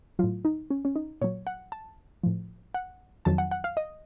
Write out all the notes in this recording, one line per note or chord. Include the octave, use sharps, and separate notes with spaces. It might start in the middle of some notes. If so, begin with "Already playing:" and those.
A2 F#3 F4
D#4
C#4
C#4
D#4
A#2 F#3 C#5
F#5
A5
A2 F3
F#5
F2 D#3 F#3 A5
F#5
F#5
F5
D#5